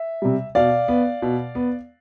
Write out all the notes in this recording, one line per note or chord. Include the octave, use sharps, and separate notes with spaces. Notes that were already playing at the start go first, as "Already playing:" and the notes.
Already playing: E5
C3 G3
B2 D5 F5
B3
B2
B3